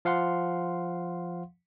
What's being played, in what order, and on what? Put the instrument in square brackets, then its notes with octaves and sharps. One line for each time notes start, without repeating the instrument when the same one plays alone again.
[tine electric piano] F3 F5 F#5 C6